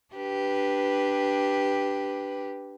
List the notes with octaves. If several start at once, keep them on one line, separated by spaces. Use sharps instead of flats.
D4 G4 B4